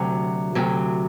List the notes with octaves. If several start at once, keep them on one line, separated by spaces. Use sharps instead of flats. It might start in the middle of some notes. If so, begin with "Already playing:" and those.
Already playing: D2 C3 F#3
D2 C3 F#3